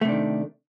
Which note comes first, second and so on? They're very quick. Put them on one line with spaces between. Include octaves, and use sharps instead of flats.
A3 C3 D4 D#3